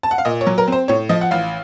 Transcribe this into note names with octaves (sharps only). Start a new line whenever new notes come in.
A5
F#5
F5
A#2 D#5
C#5
F#3
A#4
C4 C5
A2 C#5
F3 D#5
F#5
A1 F5